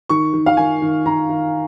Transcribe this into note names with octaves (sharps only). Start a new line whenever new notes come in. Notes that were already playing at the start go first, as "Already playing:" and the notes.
D#3 C#6
D#3
F5
D#3 G#5
D#3
D#3 A#5
D#3